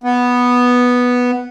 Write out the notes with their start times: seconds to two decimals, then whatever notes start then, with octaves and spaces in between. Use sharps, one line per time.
0.04 B3